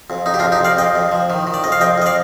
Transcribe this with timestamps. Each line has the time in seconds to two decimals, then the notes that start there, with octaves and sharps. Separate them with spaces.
0.10 F2
0.26 F2 D#4
0.34 G4
0.39 D4 F4
0.43 F2
0.52 D#4 G4
0.60 F2 D5 F5
0.77 F2 D#5 G5
0.95 F2
1.12 F3
1.30 D#3
1.47 D#3
1.54 D5
1.64 F2 D#5
1.72 F5
1.80 F2 D#5 G5
1.98 F2 D#5
2.06 D5 F5